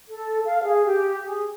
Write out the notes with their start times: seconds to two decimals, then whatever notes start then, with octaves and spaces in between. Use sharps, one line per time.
0.10 A4
0.45 F5
0.63 G#4
0.85 G4
1.23 G#4